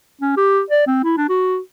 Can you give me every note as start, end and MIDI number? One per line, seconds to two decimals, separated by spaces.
0.21 0.32 61
0.37 0.61 67
0.70 0.85 74
0.87 1.00 60
1.03 1.13 64
1.17 1.25 62
1.29 1.59 66